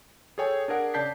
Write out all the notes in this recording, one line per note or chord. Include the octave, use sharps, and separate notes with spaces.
G#4 A4 C#5 G5 G#5
D4 G#4 A#4 F#5
C#3 D5 A5 G6 B6 C7